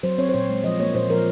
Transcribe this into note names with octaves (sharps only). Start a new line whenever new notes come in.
F#3 C5
C4 C#5
C5
A#2 C#5
G#3
F3 D#5
A#3 C#5
A#2 C5
F3 A#4